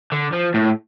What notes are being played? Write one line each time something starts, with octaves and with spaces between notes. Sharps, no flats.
D3
F3
A2